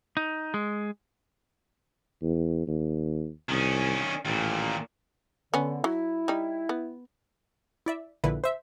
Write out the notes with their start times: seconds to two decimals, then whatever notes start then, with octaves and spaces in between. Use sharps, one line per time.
0.17 D#4
0.54 G#3
2.22 E2
2.67 D#2
3.49 C2 D#3 C#4
4.25 A1 D#2 A#2
5.54 D3 B3 C#4
5.84 F#3 E4
6.28 G3 D#4
6.69 B3
7.86 E4 D5 E5
8.24 A#1 A#2 D3 E4 B4
8.44 C5 E5